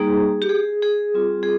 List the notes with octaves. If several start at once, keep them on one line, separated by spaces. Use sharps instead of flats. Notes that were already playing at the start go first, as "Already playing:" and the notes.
Already playing: G3 A#3 D#4 G#4
G4
G#4
G#4
G3 C4 F4
G#4